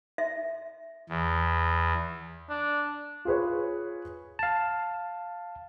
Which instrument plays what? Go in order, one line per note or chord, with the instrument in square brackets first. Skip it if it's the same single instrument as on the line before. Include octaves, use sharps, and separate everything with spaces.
[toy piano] E5
[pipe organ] E2
[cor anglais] D4
[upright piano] F4 G#4 B4 C#5
[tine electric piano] F5 A5